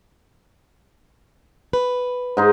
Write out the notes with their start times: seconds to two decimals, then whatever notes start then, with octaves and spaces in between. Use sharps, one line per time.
1.73 B4
2.37 G#2 D#4 C6